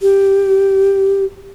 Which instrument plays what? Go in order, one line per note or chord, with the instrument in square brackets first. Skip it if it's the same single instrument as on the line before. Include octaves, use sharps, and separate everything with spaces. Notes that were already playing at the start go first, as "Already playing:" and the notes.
[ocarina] G4